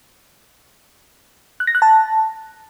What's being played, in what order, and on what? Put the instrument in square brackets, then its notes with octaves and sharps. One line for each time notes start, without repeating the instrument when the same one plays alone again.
[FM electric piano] F#6
A#6
F#6
A5